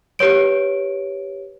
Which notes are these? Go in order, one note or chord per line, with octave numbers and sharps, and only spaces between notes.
G4 B4 C#5 D7